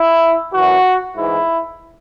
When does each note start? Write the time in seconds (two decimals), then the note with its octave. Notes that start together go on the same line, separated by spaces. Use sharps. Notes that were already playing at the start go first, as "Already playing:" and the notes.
Already playing: E4
0.53 F#2 E3 F#4
1.15 G#2 E3 E4